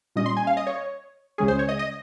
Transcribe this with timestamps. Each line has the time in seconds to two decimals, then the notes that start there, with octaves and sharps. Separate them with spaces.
0.16 A#2 G3 C#4 D#5
0.26 C6
0.37 G#5
0.47 F5
0.57 D#5
0.67 C#5
1.38 C#2 C#3 G#3 C#4 G#4
1.48 C5
1.59 C#5
1.69 D#5
1.79 D#5